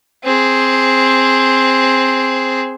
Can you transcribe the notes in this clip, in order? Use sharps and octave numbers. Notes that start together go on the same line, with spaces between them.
C4 G#4